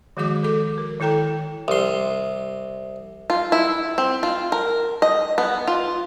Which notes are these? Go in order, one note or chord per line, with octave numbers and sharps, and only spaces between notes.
D#3 F3 G#3 F#4 G#4 D6
A4 D6
A#4
D#3 E4 A4 G5 A#5
C2 C6
F4
E4
C4
F4
A#4
D#5
B3
F4